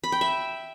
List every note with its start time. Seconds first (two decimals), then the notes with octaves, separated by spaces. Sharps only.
0.04 B5
0.12 G5
0.21 E5